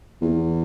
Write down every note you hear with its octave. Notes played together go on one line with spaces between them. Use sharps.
E2